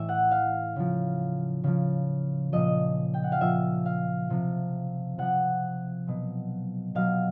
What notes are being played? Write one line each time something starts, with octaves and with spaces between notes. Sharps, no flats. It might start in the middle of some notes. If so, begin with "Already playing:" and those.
Already playing: A2 E3 E5
F#5
F5
C#3 F3
C#3 F3
A#2 F3 D#5
G5
F#5
F5
A#2 F3 E5
F5
C3 F3
C3 F3 F#5
B2 F#3
B2 F#3 F5